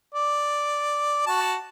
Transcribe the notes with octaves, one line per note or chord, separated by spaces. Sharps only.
D5
F#4 A5